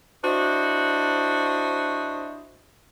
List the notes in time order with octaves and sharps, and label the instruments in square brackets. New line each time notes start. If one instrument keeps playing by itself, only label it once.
[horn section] D4 E4 F#4 C5 D#5